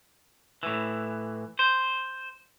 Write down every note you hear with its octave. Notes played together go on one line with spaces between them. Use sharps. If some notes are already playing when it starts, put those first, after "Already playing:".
A2 E3
C5